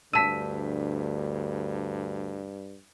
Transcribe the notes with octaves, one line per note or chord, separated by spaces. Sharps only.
D2 G2 A5 E6 B6 D#7